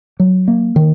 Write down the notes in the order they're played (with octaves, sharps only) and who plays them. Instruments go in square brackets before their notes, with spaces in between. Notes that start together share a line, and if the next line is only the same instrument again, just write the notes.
[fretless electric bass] F#3
A#3
D#3